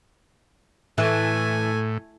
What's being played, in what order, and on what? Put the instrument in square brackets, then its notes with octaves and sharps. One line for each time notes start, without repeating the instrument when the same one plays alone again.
[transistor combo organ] A2 [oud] E3 [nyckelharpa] A3 G#5